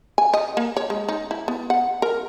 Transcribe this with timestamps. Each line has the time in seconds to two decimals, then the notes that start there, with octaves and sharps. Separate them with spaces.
0.18 G#5
0.34 D#5
0.57 A#3
0.77 C#5
0.90 G#3
1.09 D#4
1.31 E4
1.48 B3
1.70 F#5
2.02 A#4